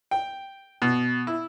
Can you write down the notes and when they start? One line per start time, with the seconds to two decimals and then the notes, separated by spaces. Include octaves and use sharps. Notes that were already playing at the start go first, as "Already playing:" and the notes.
0.11 G5
0.82 B2
1.27 E4